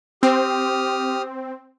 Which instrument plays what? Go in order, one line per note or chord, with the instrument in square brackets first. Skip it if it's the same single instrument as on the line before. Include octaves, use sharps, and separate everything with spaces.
[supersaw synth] C4 [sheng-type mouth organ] G4 D#6 F6